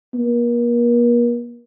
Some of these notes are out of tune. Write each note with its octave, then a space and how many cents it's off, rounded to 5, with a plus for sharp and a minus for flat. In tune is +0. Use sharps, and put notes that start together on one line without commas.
A#3 +40